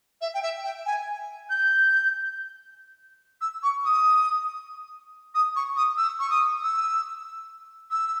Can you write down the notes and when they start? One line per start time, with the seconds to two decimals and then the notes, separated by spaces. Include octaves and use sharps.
0.21 E5
0.34 G5
0.42 E5
0.64 G5
0.86 G#5
1.50 G6
3.41 E6
3.63 C#6
3.85 D#6
5.35 D#6
5.56 C#6
5.77 D#6
5.97 E6
6.19 C#6
6.30 D#6
6.63 E6
7.91 E6